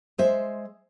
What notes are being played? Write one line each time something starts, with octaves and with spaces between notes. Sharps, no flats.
G#3 C5 E5